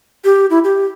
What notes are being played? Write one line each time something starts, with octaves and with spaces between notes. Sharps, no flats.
G4
E4
G4